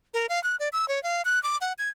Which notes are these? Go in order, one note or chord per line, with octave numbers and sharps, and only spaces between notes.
A#4
F5
F#6
D5
E6
C#5
F5
F#6
D6
F#5
G#6